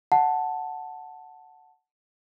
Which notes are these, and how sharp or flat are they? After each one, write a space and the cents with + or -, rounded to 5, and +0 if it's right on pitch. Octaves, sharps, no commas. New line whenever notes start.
F#5 +0 A5 +0